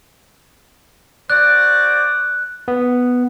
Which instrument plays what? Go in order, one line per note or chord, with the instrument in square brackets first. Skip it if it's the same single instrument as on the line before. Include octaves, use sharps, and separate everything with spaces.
[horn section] F#4 C5 D5 [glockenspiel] F#6
[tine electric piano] B3